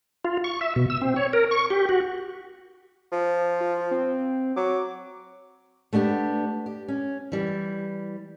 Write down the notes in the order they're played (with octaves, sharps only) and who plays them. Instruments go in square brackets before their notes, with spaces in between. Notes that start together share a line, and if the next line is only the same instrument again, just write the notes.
[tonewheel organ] F4
C#6
E5
B2
E6
C4
C#5
A#4
C#6
G4
F#4
[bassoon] F3
[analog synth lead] F4
C4
[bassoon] F#3 [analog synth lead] D6
[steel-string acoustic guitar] A3 B3 D4 G4
G4
C#4
E3 G3